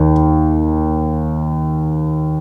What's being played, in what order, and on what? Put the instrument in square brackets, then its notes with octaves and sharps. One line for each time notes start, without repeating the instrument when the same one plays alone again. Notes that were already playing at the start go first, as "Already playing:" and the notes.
Already playing: [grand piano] D#2